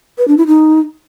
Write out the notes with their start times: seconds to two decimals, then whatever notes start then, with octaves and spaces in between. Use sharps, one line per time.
0.18 B4
0.28 D4
0.37 E4
0.47 D#4